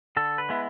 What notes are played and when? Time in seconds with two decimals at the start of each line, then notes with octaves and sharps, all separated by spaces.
0.17 D3 A4
0.38 B4
0.49 G#3 B3 E4